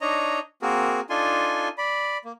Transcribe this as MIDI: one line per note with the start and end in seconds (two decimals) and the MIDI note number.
0.01 0.39 62
0.01 0.39 63
0.01 0.39 73
0.01 0.39 75
0.01 0.39 82
0.62 1.00 58
0.62 1.00 60
0.62 1.00 66
0.62 1.00 68
0.62 1.00 70
1.10 1.68 62
1.10 1.68 63
1.10 1.68 65
1.10 1.68 69
1.10 1.68 80
1.10 1.68 84
1.78 2.17 74
1.78 2.17 83
2.24 2.32 58